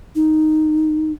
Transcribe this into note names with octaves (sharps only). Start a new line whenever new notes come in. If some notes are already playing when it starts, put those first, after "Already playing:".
D#4